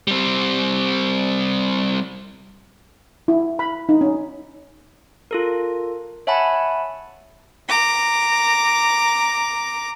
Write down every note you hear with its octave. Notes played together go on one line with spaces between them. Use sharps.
G3 C4
E4
B5
D#4
C#4
F4 A4 A#4
C#5 E5 F#5 G#5 A5 B5
A#5 D6